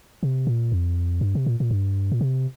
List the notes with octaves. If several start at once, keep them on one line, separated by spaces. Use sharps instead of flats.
C3
A#2
F2
G2
C3
A#2
A#2
G2
A#2
C3